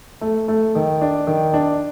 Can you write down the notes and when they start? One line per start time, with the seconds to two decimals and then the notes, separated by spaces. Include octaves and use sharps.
0.21 A3
0.48 A3
0.75 D#3
1.01 D4
1.27 D#3
1.54 D4